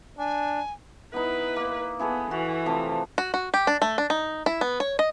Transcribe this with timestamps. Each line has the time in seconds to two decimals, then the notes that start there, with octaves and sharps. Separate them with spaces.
0.19 D4 G#5
1.14 B3 D#4 E4 B4
1.56 A#3
1.99 B3 E4 G#4 A4
2.31 E3 F#4
2.66 C3 F3 A3
3.18 F#4
3.34 F#4
3.54 G4
3.67 D4
3.82 A3
3.98 D4
4.10 D#4
4.46 E4
4.61 B3
4.80 C#5
4.99 D#5